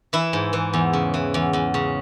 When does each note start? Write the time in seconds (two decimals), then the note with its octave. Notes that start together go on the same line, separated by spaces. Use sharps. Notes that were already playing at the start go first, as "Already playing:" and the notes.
0.13 E3 E4
0.33 G#2
0.53 E3
0.73 E2
0.93 C#3
1.14 E3
1.34 E2
1.53 E2
1.74 C#3